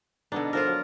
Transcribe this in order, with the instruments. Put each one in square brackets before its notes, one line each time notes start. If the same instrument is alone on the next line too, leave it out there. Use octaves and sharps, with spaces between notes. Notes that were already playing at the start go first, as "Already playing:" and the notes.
[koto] B2 D4 [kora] D3 B3 D#4
[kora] D3 F3 [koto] F4 A4 A#4
[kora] F#3